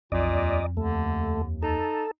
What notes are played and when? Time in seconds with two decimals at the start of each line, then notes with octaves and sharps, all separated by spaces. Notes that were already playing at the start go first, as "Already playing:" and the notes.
0.12 B1 F2 A#2 D5 D#5
0.35 D#2
0.77 D#2 D3 A3
1.63 D#4 A4